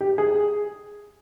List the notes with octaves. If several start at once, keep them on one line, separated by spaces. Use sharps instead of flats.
G4
G#4